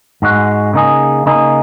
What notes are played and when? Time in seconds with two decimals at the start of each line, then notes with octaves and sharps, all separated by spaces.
0.22 G#2 G#3 F#4
0.74 C#3 A#3 D#4 G#4
1.26 C#3 A#3 D#4 G#4